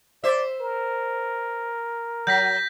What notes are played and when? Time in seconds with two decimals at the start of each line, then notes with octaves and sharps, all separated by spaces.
0.24 C5 D5 E5
0.61 A#4
2.27 F#3 G6 A#6 B6